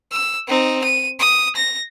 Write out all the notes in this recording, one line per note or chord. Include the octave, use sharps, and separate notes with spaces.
E6
C4 D#4
D#7
D#6
A#6